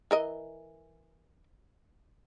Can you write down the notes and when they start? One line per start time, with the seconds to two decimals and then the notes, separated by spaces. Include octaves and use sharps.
0.11 E3 A#4 D#5